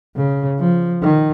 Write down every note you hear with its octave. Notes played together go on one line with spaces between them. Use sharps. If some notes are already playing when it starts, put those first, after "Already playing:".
C#3
F3
D#3